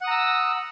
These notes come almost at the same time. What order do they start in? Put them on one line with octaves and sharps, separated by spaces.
F#5 D#6 A#5 E6